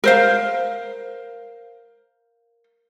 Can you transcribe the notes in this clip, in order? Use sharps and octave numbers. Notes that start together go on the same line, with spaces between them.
A#4 C5 F5